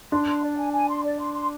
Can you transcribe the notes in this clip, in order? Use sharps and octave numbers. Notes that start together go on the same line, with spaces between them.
D4 C6
C6
D5
G#5
G#5
C6
D5
C6
C6